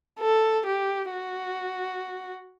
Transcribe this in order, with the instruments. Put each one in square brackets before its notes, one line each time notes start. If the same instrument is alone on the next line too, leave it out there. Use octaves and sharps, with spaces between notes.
[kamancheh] A4
G4
F#4